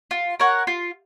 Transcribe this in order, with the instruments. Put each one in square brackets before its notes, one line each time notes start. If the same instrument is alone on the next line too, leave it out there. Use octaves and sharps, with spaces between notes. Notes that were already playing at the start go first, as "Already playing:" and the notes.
[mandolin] F4
A#4 C#5 F#5
F4